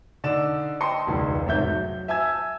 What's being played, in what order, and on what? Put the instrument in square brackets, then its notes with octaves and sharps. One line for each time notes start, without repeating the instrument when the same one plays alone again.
[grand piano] D3 D#4 D5 E6 E7
D#5 G5 A5 C6 C#7
E1 C#2 D#3
F1 G#2 C#5 E5 G6
F#3
E5 G#5 A5 E6 G#6